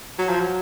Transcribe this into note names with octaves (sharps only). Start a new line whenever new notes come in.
F#3
F3
F#3